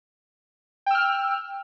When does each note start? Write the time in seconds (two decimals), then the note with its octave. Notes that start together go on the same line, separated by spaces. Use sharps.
0.86 G5
0.91 E6
0.95 F6